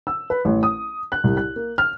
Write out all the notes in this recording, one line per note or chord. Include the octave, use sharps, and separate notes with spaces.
E6
B4
A1
D#6
F#6
C2
F#6
A#3
F6